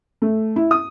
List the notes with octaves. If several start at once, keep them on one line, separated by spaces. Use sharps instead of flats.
A3
E4
D#6